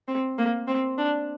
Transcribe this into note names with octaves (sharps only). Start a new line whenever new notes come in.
C4
A#3
C4
D4